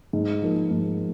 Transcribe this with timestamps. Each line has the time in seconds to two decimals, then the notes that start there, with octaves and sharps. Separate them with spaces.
0.13 G#2
0.42 F3 A#3 D#4
0.71 G#2